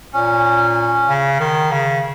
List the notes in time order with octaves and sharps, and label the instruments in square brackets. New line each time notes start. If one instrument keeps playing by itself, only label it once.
[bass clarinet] A#2 [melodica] C#4
[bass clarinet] C#3
D#3
C#3